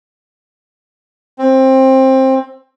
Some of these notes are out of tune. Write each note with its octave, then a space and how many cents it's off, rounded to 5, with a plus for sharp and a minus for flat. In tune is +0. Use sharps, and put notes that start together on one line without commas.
C4 +15